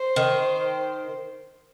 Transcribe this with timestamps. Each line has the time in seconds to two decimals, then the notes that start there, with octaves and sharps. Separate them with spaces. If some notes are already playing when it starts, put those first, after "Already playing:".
Already playing: C5
0.16 D#3